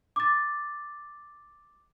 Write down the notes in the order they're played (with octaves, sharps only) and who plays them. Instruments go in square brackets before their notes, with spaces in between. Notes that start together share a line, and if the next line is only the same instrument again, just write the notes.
[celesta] D6 A6